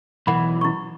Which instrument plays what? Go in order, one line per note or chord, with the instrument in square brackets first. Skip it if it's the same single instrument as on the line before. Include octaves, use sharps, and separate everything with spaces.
[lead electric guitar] B1 E3 [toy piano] F#5 B5
[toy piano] E4 C#6